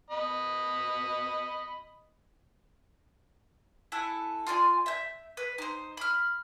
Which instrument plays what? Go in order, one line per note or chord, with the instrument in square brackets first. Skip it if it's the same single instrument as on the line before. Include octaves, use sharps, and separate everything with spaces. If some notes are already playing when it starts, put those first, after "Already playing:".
[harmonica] D#5 B5
[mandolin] E4 F#4 A4 G#5
F4 D5 G#5 C6
E5 G6
B4
D#4 C5
B5 F6